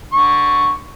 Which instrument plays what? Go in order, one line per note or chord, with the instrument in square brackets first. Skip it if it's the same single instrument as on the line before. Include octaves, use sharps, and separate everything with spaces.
[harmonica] D3 C#6